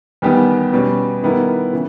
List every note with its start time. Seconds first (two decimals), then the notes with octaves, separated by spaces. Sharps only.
0.22 E2 D#3 G3 B3 G4
0.73 B2 G3 C#4
1.23 D#3 G3 B3 E4 A#4
1.73 C#3 E3